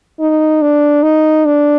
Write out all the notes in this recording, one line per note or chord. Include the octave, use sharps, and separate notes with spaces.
D#4
D4
D#4
D4